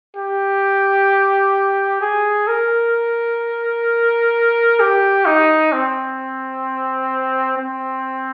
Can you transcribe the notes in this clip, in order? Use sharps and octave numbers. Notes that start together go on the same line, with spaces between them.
G4
G#4
A#4
G4
D#4
C4
C4